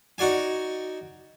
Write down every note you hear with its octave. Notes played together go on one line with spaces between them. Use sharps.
D#4 F#4 D5 G#5